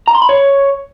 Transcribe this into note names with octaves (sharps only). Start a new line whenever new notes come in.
A#5
C6
B5
C#5